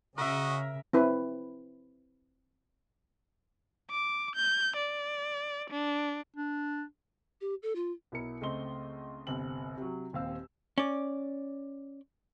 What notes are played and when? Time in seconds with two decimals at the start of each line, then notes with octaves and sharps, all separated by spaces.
0.18 C#3 F#4 A#4 D#5 E5
0.93 C4 E4 B4
3.91 D6
4.36 G6
4.76 D5
5.70 D4
6.36 D4
7.41 G4
7.63 A4
7.75 F4
8.12 B1 E4 A#4 C#7
8.41 C#2 A3 C4 D#5 C6 G7
9.27 G1 C2 C4 F#7
9.78 C3 F#3
10.13 D#1 D#2 C4 F5 E6
10.78 C#4 D5